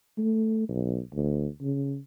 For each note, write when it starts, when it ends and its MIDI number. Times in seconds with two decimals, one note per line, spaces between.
0.18 0.68 57
0.69 0.99 35
1.15 1.47 38
1.62 1.98 49